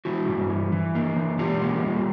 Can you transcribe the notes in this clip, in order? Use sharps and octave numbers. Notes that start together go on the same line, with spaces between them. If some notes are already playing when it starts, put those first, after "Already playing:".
E3 E4 F#4
G2
E3
E3
A#3
E3
E3 F4 G4
A#3
G3